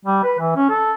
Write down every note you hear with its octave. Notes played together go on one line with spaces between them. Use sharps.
G3
B4
E3
C#4
A4